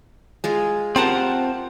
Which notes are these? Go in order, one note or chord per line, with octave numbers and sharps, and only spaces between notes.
G#3 F4 G#4
C4 F4 G4 A#4 F#5 A5